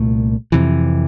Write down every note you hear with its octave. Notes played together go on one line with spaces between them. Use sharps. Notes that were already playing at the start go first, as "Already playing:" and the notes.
Already playing: C2 A#2 A3
F2 C3 E3